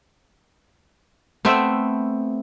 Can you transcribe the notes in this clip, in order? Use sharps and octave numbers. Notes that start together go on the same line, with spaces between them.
A3 B3 C4 E5